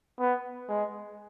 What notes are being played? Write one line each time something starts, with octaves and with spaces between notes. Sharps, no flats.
B3
G#3